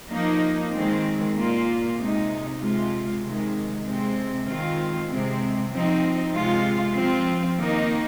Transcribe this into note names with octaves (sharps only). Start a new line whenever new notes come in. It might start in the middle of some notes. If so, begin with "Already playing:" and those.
F3 A#3 D#4
D#3 G#3 C4
A#2 A#3 F4
C3 G#3 D#4
C3 G#3 F4
C3 D#3 G#3
C3 G#3 C4
D#3 G#3 C4 F4
C3 G#3 C4
F3 C4 D#4
C3 G#3 F4
F3 C4 F4
D#3 A#3 D#4